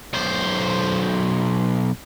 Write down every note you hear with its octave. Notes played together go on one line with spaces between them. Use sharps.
B1 C5